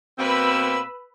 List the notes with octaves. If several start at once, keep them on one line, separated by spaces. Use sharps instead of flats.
B2 A#3 C4 B4 B5 E6